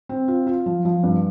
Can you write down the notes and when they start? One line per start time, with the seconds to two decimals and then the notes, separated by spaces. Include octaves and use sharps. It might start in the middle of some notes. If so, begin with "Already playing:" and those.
0.09 C4
0.28 F4
0.47 F4
0.66 F3
0.85 F3
1.03 G2